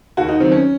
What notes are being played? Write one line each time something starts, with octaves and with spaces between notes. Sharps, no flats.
D#2 F#4
D#4
D#3 F#3 C4
C#4